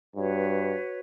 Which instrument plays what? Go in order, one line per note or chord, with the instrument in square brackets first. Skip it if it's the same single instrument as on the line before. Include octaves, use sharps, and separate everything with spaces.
[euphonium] G2 [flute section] F#4 B4 C#5